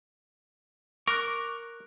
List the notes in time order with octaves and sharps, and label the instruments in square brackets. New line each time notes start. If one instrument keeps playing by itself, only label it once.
[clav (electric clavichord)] A#4 [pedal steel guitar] C#6 D6 F#6